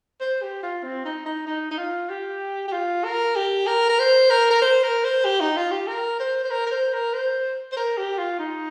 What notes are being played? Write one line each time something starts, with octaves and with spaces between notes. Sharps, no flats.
C5
G4
F4
C4
D#4
D#4
D#4
D#4
F4
G4
G4
F4
A#4
G4
A#4
A#4
C5
A#4
A#4
C5
A#4
C5
G4
D#4
F4
G4
A#4
C5
C5
A#4
A#4
C5
A#4
C5
C5
A#4
G4
F4
D#4